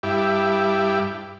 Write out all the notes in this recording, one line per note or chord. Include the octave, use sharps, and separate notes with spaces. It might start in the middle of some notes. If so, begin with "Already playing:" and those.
G2 E4 G4